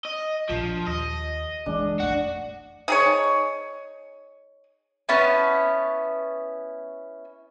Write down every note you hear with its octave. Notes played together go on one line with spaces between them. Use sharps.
D#5
A#1 A#2 F3 D4
D#2 D#5
F#1 E3 G#3 D4
A#1 F2 A3 F#4
D#4 G#4 C#5
B3 C#4 E4 A5